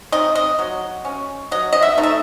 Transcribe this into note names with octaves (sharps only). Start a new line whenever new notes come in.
C4 D#4 D#5
D#5
F#3
C#4
F#3 D#5
D#5
E5
A3 D#4
E5